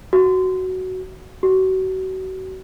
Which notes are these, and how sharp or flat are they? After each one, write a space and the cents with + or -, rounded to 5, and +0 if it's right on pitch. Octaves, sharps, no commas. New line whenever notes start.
F#4 +10
F#4 +30